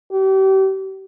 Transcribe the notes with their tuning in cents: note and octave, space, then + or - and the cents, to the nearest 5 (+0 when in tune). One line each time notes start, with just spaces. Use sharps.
G4 -35